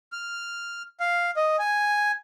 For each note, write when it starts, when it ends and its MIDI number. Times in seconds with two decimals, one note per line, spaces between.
0.12 0.82 89
1.00 1.31 77
1.36 1.56 75
1.59 2.12 80